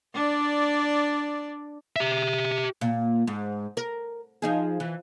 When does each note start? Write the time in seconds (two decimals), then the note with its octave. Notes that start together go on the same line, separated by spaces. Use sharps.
0.14 D4 D5
1.96 G4 E5
2.81 A#2
3.27 G#2
3.77 A#4
4.42 F3 D#4 G#4
4.80 E3